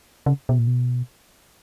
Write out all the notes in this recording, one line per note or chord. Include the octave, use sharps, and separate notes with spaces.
C#3
B2
A#2
B2